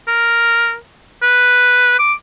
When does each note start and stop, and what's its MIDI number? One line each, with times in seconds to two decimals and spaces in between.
0.07 0.76 70
1.22 1.95 71
1.99 2.13 86